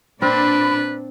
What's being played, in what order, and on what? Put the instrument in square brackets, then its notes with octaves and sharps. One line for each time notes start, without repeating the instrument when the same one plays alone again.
[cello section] A#2 D4 D5 [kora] C4 [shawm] B4 [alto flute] B5